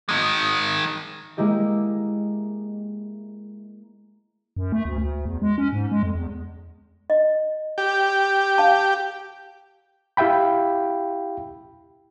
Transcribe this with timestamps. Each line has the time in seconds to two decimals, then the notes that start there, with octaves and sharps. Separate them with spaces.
0.09 D#3 G#3
1.37 G#3 A#3 E4 G4 D#5
4.57 F#2
4.72 A3
4.85 D2
4.98 D2
5.25 E2
5.42 G#3
5.58 C#4
5.73 G#2
5.91 G#3
6.03 F2
6.15 E2
7.10 D#5
7.78 G4
8.58 F5 A5
10.17 E4 G4 E5 F5 G5 B5